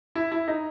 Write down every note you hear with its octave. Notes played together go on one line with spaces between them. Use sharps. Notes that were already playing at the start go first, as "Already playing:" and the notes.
E4
E4
D#4